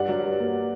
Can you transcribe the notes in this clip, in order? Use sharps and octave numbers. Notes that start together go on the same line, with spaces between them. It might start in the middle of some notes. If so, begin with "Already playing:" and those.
Already playing: G2 D5 F#5
F#3
G2
A#3